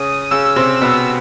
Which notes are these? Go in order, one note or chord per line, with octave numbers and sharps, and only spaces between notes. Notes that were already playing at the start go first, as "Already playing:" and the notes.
Already playing: C#3 C#4 D#6
C#3 C#4 E6
C3 C4
B2 B3